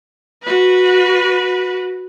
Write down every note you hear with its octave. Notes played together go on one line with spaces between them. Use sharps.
F#4 B4